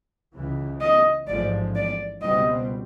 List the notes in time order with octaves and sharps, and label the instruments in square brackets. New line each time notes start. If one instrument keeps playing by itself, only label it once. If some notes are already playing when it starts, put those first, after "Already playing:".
[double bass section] C#2 C#3 E3
[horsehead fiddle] D#5
[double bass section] A1 G#2 F3 G#3 [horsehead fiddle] D5
[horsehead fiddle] D5
[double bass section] C#2 B2 G3 C4 [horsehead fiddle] D#5